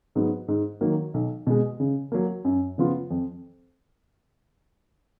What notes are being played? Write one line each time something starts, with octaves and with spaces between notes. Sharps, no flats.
G#2 F#3 B3
G#2
D#3 F#3 A#3
B1
B2 G#3
C#3
F#3 A#3
F#2
C#3 F3 B3 F4
F2